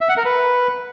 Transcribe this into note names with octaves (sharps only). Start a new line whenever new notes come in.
E5
F#5
A#4
B4